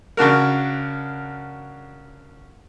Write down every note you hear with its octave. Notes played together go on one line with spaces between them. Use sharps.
C#3 D4 F#4 A#4